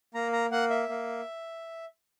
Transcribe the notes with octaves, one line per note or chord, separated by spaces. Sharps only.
A#3 A#5
A#5
A#3 F#5
E5
A#3